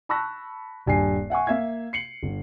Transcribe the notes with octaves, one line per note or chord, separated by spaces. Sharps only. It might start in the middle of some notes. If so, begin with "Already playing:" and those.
A5 B5 C#6 E6 F#6 A#6
D#1 G2 G#5 C7
E5 F#5 G#5 C#6
A#3 E5 F5 G#6
C7 C#7 F#7
G1